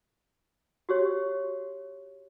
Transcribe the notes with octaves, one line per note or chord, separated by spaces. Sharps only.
F#4 G4 C#5